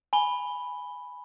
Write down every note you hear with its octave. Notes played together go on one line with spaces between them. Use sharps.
G#5 B5 G7